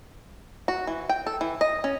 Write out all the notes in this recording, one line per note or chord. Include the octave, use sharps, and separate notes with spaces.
F#4
E3
G5
A4
E3
D#5
C#4